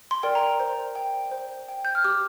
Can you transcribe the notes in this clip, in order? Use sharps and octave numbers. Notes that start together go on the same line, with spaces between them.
C6
A#4 D5 G5
A#5
C5
G5
C5
G5
G6
F6
G4 D6